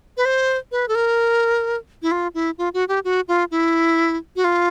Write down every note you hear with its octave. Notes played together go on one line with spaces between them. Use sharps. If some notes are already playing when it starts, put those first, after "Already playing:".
B4
C5
B4
A4
A#4
E4
F4
E4
F4
F#4
G4
F#4
F4
E4
F#4
F4